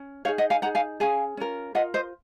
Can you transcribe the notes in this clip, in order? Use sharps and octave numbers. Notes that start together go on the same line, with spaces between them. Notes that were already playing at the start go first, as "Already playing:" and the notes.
Already playing: C#4
D#4 G#4 C#5 F5
D#5 F#5
F5 G#5
D#4 G#4 F#5 A#5
F5 G#5
C#4 G#4 F5 G#5
C#4 F4 A#4
F4 A#4 D#5 F#5
C5 D#5